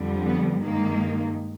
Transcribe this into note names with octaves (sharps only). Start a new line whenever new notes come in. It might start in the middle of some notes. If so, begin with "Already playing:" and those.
Already playing: F2 D3 G3
B3
G2 D#3 G#3 A#3